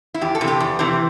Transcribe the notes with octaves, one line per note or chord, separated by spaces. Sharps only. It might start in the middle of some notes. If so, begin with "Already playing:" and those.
E4
E2 G4
A4
C3 E3
G4
E2
C3 E3